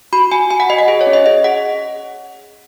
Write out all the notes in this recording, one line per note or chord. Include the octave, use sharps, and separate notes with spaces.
F#4 B5
F#4 G#5
F#4 G#5
F#5
F#4 D#5
F#5
G#4 D#5
C#5
C#4
D#5
G#4 D#5
G#4 F#5